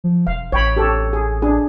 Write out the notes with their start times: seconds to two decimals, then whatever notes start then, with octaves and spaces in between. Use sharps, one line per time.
0.04 F3
0.27 E1 F5
0.52 A1 C#5 G5 B5
0.76 G4 A4 C#5
1.13 G#4
1.42 D4 G#4